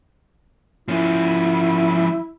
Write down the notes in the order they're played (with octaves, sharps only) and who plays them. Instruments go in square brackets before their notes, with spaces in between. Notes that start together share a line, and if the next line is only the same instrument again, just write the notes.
[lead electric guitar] F3 C#4 [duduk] E4